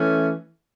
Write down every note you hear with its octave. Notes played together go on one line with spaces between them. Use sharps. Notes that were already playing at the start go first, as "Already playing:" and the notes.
Already playing: E3 A3 C#4